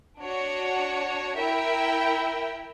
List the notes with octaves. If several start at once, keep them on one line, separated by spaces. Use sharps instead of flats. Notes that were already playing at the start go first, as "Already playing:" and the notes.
D4 F#4 C#5
E4 A#4 E5 G5